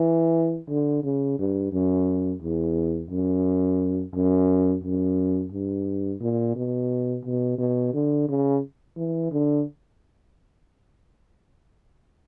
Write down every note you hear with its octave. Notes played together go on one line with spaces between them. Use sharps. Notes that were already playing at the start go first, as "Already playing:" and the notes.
Already playing: E3
D3
C#3
G2
F#2
E2
F#2
F#2
F#2
G2
A#2
B2
B2
B2
D3
C#3
E3
D3